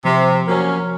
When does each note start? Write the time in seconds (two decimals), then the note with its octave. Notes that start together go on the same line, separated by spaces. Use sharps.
0.05 C3 F3
0.46 F#3 A#3 C#4